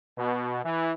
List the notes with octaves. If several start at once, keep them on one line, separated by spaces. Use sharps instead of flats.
B2
E3